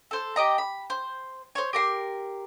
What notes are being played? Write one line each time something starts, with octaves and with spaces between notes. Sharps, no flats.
A4 C5
G4 D#5 A#5
B5
C5
C5 C#5
G4 A#4 C6